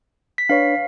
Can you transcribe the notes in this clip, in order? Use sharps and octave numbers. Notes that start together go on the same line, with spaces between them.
B6
D4 B4 C#5 F5